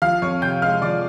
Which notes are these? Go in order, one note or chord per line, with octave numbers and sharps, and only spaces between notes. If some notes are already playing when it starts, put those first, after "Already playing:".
F3 F5 F6
F2 C#5 C#6
C3 G5 G6
G#3 F5 F6
F3 D5 D6